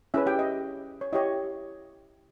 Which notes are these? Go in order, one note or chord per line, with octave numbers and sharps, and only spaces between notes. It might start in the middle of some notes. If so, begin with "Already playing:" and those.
C#4 E4 G#4 B4 E5
G4 G5
D#5
C#5
E4 G4 C#5 D#5